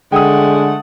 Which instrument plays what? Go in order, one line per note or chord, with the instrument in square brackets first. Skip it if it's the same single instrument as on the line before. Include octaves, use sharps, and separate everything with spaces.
[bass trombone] D3 [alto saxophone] G#3 [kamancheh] A3 F#5 [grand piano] G5 D#6